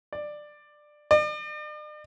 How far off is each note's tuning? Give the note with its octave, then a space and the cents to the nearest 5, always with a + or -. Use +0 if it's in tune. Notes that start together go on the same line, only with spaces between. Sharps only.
D5 +15
D5 +45